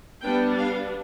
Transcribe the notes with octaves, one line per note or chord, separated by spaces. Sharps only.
G3 B3 D4 G5
F5